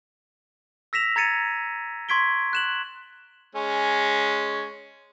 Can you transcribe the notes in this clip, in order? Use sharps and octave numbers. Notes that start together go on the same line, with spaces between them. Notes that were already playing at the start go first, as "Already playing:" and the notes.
E6 A#6 B6 E7 F7
A#5 G#6 A6 C#7 D#7
C6 C#6 G#6 B6 D7 G7
F#6 E7 F#7
G#3 C#4